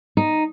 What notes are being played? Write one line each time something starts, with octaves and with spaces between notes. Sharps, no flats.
D#4